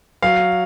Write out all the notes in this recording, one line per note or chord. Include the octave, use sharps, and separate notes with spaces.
F#3 F5